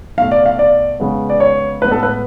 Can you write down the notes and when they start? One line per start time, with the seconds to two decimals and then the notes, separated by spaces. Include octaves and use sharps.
0.17 B2 A3 F5
0.31 D5
0.46 F5
0.59 D5
1.00 C#3 G#3 B3
1.30 D5
1.40 C#5
1.82 A2 B4
1.84 G#3 B3
1.91 A4
2.03 B4